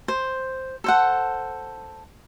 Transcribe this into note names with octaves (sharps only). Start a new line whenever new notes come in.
C5
A4 C5 F#5